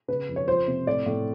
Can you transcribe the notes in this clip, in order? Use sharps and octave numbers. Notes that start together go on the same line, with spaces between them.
C#3 B4
F2
C#5
F3 C5
C3
A2 D5
A2